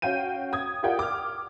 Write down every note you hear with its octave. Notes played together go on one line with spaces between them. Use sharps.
C#4 F#4 F5 G5 G6 D#7
D#6 G#6
F4 G4 A#4 D5 F#5 G5
D6 F6